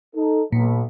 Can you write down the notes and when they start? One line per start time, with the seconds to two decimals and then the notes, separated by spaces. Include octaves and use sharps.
0.15 D#4 A4
0.53 B1 A#2